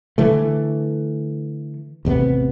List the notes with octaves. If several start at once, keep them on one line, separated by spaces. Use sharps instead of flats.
D3 E3 A3
A1 E2 C3 B3